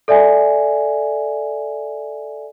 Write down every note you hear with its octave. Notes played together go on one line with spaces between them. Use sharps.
A4 D5 E5 G#5